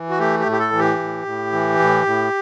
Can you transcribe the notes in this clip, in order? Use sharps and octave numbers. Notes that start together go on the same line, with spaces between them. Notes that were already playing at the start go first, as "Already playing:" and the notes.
Already playing: E3
F#4
A3 G4
G4
A2
G4
A4
E3
G4
A2
A2
E3
A2
A2